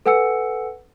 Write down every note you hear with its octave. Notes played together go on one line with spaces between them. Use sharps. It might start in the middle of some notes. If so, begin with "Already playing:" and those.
A4 B4 F#5 G#5 E6 C#7